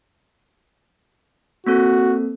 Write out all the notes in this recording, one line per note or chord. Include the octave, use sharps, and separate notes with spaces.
A#3 C4 F#4 A4